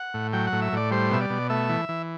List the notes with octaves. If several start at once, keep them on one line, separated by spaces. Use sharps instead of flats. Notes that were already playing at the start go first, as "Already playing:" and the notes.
Already playing: F#5
A2
F#3 G5
F#5
A2
E5
A2 D5
G3 C5
B2 E5
D5
B2
A3 E5
E3
E3